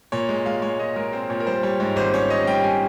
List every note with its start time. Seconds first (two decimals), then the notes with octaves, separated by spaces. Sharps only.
0.12 A#2 C#5
0.29 G#3
0.46 G#3 F5
0.62 G#3 C#5
0.79 A#2 D#5
0.96 G#3 A#4
1.12 C4 C5
1.30 A#2 C#5
1.40 A#4
1.47 G3 C5
1.63 G3 C#5
1.80 G#2 C#5
1.96 G#1 C5
2.14 C#4 C#5
2.30 C#4 D#5
2.47 G3 G5
2.64 C#4 G#5